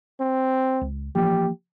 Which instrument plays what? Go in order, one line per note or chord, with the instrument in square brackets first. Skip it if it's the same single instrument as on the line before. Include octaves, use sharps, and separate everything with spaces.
[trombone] C4
[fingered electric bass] C#2
[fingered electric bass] E3 F3 A#3 [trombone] G4